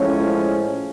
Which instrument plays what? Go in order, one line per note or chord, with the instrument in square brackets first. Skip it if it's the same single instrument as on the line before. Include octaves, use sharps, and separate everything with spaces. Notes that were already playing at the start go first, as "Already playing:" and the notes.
Already playing: [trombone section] A2 F3 G#3 C#4